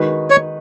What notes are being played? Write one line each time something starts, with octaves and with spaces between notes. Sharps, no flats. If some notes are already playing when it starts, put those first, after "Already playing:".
Already playing: D#3 G#3 D#4 F#4 B4
C#5